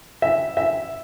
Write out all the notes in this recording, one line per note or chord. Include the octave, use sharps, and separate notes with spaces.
E5
E5